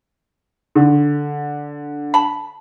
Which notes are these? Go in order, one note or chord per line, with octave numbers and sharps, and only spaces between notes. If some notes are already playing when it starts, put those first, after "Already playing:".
D3
A5 B5